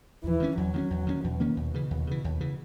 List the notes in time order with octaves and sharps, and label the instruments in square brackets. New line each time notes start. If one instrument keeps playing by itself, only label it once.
[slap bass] E2 [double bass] E3
[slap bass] D#3 A#3 C#4
[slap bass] E2 [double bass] F#3
[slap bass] D#3 A#3 C#4
E2
D#3 A#3 C#4
[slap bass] E2 [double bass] B2
[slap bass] D#3 A#3 C#4
D#2
C#3 E3
D#2
C#3 E3
D#2
C#3 E3